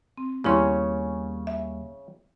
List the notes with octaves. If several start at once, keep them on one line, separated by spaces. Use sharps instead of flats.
C4
D#2 C#3 G3 A#3 B3 C#4 E4 C6
E5